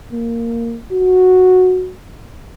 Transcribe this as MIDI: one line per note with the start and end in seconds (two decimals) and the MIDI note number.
0.13 0.78 58
0.93 1.91 66